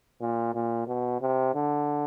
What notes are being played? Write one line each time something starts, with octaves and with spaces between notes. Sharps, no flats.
A#2
A#2
B2
C3
D3